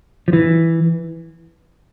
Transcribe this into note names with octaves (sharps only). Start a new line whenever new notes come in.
F3
E3